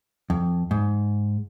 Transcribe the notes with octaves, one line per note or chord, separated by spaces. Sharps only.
F2
G#2